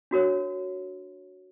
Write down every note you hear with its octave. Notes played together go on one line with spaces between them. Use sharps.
D4 F#4 A#4 C#5